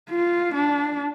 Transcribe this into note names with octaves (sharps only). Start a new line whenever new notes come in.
F4
D4